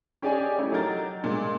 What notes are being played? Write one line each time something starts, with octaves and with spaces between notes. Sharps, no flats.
C#4 G4 G#4 D5 D#5 G#5
A3 C#4 E4 G4
F#3 D#4 G4 A#4 G6 A6
G2 A#2 G#3